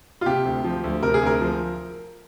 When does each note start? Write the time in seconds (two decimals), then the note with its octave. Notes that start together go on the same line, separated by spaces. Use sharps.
0.21 F4
0.26 C3 G4
0.45 D2
0.64 F3
0.84 D2
1.03 C3 A#4
1.14 G#4
1.22 D2 A#4
1.41 F3